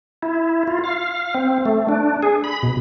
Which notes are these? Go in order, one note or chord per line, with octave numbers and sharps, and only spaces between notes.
E4
F4
F5
C4
A3
D4
G#4
B5
B2